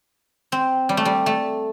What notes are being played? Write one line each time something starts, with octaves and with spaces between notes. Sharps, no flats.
C4
G3
A3
G3
A3